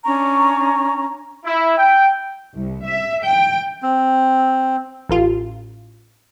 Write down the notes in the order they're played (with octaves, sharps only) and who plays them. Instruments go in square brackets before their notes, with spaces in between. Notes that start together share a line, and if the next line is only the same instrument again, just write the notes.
[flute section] C#4 D4 A#5 C#6
[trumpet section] E4
G5
[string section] C2
E5
G5
[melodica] C4
[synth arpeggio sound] A1 F4